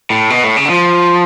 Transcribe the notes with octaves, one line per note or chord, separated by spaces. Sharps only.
A2
B2
A2
C#3
D3
F3